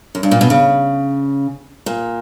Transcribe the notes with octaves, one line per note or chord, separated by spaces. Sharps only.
F#2
G2
A#2
B2
C#3
A#2